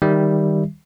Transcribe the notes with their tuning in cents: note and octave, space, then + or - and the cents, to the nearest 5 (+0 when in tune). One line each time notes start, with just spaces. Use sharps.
D#3 +0 G3 +0 E5 +0